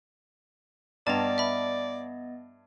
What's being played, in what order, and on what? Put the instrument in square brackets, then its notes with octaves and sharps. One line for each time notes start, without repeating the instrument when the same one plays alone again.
[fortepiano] G2 [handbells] B3 D#5 A6 [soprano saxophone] D5 [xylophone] A5 A#5
[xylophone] E5 B5